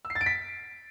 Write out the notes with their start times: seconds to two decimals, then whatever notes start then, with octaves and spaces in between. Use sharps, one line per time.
0.05 E6
0.10 C7
0.15 A6
0.21 D7
0.26 B6